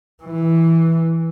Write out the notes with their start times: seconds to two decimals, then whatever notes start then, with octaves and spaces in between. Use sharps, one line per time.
0.24 E3